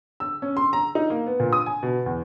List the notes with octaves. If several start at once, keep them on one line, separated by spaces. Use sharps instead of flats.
E6
C#4
C6
A#5
D#4
A#3
B3
A#2
D#6
G#5
B2
E2